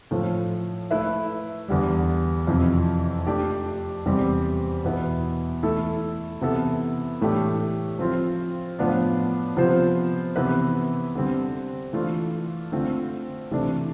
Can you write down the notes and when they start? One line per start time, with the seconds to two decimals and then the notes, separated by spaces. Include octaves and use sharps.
0.11 A2 F3 A3
0.91 A3 E4 B4 E5
1.68 E2 D3 G3
2.47 F2 C3 E3
3.26 A3 D4 G4 D5
4.06 E2 C3 G3 C4 G4
4.84 E2 B2 B3 E4 B4
5.63 E3 A3 E4 A4
6.41 C3 E3 B3 E4 A4
7.21 A2 E3 A3 D4 G4
7.99 F3 C4 F4
8.79 A2 F3 B3 D4
9.57 C3 F3 B3 F4 C5
10.36 C3 E3 B3 E4 B4
11.15 D3 G3 C4
11.93 E3 A3 D4 F4
12.72 D3 A3 C4 F4
13.51 C3 E3 A3 D4